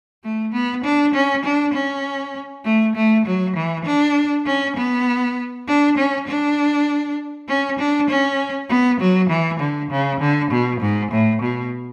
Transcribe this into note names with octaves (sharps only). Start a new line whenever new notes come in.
A3
B3
D4
C#4
D4
C#4
A3
A3
F#3
E3
D4
C#4
B3
D4
C#4
D4
C#4
D4
C#4
B3
F#3
E3
D3
C#3
D3
B2
G#2
A2
B2